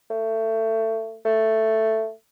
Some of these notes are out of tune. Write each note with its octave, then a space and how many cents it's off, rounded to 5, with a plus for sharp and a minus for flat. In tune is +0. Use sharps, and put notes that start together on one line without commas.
A3 +25
A3 +5